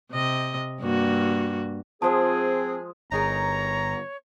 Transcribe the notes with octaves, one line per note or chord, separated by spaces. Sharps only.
C3 D#5
G2 A#3 F#4
F3 G#3 C4 G#4 A5 D#6
G1 D#4 G#4 A#4 C#5 A#5